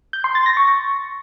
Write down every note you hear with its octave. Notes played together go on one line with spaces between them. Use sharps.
G6
C6
A6
A#6
C#6